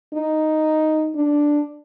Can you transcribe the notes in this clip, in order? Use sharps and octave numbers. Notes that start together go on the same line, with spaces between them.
D#4
D4